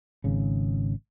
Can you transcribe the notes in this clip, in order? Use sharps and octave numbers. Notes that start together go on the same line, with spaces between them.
G#1 C#3